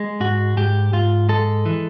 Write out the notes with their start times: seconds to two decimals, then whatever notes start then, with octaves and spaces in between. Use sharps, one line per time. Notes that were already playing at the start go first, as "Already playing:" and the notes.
Already playing: G#3
0.20 G#2 F#4
0.57 G#2 G4
0.93 G#2 F4
1.29 G#3 A4
1.66 E3